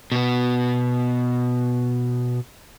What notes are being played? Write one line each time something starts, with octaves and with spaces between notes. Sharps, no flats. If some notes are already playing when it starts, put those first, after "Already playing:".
B2 B3